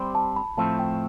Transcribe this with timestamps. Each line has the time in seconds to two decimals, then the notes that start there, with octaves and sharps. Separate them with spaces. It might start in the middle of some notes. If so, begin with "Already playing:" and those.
Already playing: G3 C4 G4 C5 B5
0.15 A5
0.36 B5
0.57 A2 F3 A3 C4 A5
0.79 G5